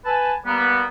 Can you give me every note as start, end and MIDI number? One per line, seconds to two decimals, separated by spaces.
0.05 0.34 71
0.05 0.34 80
0.05 0.34 81
0.46 0.84 55
0.46 0.84 58
0.46 0.84 59